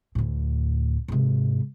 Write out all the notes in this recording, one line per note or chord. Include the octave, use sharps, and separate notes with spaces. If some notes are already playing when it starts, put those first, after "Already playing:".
D2 A2
G#2 C3